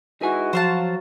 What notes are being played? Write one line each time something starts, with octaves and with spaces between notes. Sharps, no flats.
G#3 D#4 E4 F#4 B4 G#5
F3 F#3 C5 F5 A5